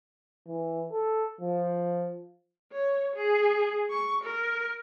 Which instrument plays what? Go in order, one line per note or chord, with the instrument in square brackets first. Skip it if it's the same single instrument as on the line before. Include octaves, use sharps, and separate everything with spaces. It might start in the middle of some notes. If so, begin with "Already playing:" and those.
[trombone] E3
A4
F3
[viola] C#5
G#4
C#6
A#4